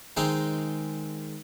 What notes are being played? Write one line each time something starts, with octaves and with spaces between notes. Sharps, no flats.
D#3 G#3 C4 D#4